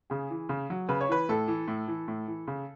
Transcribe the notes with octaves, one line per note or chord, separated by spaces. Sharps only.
C#3 G#4
E3
C#3
F#3
C#3 B4
C#5
E3 B4
A2 A4
E3
A2
E3
A2
E3
C#3